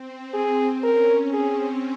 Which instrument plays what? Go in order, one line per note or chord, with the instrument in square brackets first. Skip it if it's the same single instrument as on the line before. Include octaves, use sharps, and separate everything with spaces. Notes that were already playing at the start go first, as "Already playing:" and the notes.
Already playing: [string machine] C4
[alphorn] G#4
[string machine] C#4 [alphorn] A#4
[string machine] C4 [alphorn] G#4